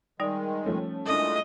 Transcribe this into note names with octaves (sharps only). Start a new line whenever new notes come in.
D#3 G3 G#3 D#4 D5
F3 A3 C#4
A#2 G#3 A3 D4 E4 A4 D#5